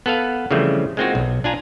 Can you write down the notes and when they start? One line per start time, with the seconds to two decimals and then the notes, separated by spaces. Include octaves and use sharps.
0.06 B3 A4 B4 F5
0.51 C#3 E3 F3 G3 A3 C4
0.97 G#3 A#3 C4 D#4 F4 F#4
1.15 B1
1.44 D4 F4 G#5 A#5